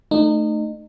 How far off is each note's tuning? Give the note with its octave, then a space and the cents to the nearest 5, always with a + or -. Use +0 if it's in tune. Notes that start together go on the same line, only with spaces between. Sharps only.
A3 +0 D#4 -30